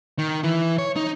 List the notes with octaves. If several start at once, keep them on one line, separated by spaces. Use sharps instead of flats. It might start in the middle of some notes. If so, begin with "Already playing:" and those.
D#3
E3
C#5
D#4